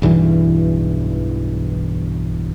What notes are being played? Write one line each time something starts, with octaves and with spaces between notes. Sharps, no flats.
B1 E2 G2 E3